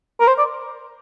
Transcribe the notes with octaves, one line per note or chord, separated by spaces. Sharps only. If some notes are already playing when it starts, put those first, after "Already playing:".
A#4
C5
D5